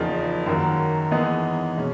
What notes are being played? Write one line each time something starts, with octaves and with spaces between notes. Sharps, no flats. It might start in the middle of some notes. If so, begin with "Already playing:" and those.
Already playing: E2 C#3 F3 A#3 D#4
F#2 D#3 F#3 A#3
E3 G#3 B3 D#4 G#4
B2 G#3 C#4